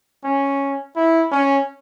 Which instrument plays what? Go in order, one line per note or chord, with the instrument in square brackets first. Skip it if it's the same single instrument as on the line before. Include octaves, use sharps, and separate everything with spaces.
[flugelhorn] C#4
E4
C#4